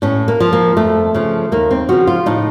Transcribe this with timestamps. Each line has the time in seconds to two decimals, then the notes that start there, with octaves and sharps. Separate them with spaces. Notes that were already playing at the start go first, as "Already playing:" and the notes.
0.02 A2 C#4
0.28 A#3
0.40 F3
0.53 A#3
0.77 F2 A3
1.14 C#3 F3
1.52 D#2 A#3
1.71 C4
1.89 C#3 F3 F#4
2.07 F4
2.26 A2 D#4